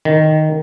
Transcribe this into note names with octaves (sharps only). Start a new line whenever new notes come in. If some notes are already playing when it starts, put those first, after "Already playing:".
D#3